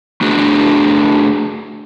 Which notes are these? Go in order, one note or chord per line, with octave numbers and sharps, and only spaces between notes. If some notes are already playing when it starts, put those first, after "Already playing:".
A3 D4 F#4 G#4